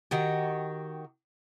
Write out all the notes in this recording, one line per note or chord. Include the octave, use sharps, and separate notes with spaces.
D#3 F#4 G4